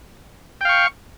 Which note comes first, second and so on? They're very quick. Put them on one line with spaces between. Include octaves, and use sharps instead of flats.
G5 F5 C#6